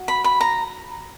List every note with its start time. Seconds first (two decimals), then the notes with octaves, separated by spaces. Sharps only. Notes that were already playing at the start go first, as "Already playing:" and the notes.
Already playing: F#4
0.08 B5
0.24 B5
0.41 A#5